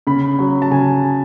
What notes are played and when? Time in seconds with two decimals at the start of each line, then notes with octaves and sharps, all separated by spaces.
0.07 C#3 B5
0.39 F#3
0.62 A5
0.71 C#3 G#5